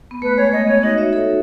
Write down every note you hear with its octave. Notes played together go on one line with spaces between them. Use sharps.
B3
A3 B4
G#3 C#5
A3 D#5
B3 C#5
D#4 F#4 D#5
C#5 E5
A4 C#5